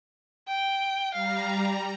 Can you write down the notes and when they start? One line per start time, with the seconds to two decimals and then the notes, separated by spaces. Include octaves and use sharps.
0.48 G5
1.14 G3 F5 A#5